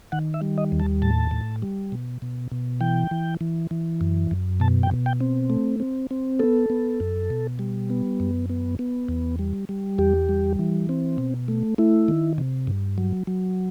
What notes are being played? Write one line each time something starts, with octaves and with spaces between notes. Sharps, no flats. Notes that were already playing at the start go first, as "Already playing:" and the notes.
D#3 F#5
E5
G3
D#5
D#2
A5
A2 A5
A2
G3
B2
B2
B2
E3 G5
E3
E3
E3
F#2
F#2
B2 A5
G5
B2
G5
C4
A3
C4
C4
B3 A4
B3
F#2
B2
G3
B3
F#2
B3
B3
E2
G3
G3
E2 G4
G3
E3
C4
B2
A3
A3 E4
D#3
C3
G2
F#3
F#3